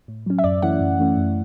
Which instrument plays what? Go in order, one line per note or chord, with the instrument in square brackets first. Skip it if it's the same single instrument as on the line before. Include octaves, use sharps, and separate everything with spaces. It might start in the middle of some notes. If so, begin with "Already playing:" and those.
[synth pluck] A2
F#3 C#4
E5
F#2 D5
E3 A3 C#4 E4 F#5
F#2
E3 A3 C#4 E4
F#2